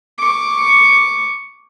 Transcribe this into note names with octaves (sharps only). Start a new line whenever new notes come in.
C#6 D6